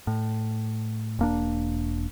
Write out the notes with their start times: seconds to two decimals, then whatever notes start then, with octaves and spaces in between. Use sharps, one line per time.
0.07 A2
1.19 E1 A#3 D4